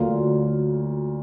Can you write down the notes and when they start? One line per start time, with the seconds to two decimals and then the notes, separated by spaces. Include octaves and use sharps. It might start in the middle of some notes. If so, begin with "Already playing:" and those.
Already playing: D2 D3 F#3 A#3 F4